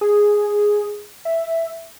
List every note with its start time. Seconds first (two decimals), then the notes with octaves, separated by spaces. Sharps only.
0.01 G#4
1.25 E5